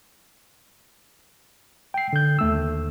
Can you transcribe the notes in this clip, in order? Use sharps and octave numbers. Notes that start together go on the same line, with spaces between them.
G5 C7
D3 G6
D#2 A3 E6